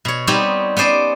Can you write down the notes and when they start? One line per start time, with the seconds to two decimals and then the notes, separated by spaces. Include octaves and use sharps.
0.05 B2 C#5
0.27 G3 B3 C4 D#4 G4 C#5
0.77 B3 C#4 C5 D5